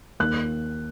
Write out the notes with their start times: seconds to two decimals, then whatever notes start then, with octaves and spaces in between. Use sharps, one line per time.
0.20 D#2 F#6